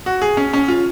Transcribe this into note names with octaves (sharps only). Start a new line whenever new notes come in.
F#4
G#4
C#4
C#4
F4